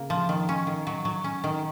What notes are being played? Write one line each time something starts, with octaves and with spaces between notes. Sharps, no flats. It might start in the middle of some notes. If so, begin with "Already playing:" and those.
Already playing: C#3 A#3
F3
D#3
C#4
D#3
F#3
F#3
C#4
D#3